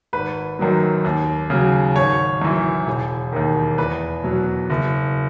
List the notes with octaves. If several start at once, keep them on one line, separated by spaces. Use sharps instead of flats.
G#1 B4
F#2 D#3 F#3
D#2
C#3 F#3
G#1 C#5
F#2 E3
E1
D#2 D#3
E2 B4
B2 F#3
F#1